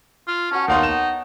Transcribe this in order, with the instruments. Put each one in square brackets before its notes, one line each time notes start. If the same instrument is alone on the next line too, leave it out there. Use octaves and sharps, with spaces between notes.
[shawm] F4
[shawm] C#4 [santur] F#4 B4 A5
[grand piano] D#2 F5 C6 [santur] B3 C#5 G5 [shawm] D#4
[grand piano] E7